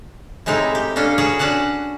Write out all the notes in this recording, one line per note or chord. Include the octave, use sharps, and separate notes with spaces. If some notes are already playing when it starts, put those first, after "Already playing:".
A2 C3 G#3 D#4 E4
G4
A#3 C#4 D4 A4
F#4 G#4 B4 C#5 F#5
C#4 D4 F#4 F#5 A5